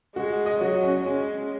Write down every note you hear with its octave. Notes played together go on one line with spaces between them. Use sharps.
G#3 F#4
D#5
F#3 F#4
C#4
G#3 C#4